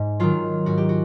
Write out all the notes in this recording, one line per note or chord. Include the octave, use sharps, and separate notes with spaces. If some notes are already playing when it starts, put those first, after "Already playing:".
Already playing: G#2
D#3 F#3 F4
G#2 F#4
G4
F#4